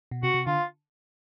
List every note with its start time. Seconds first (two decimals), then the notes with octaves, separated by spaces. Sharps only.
0.11 B2
0.23 C3 F#4
0.34 C3
0.47 D3 F4